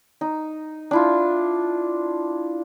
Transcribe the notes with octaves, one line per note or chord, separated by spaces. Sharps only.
D#4
D4 E4 F4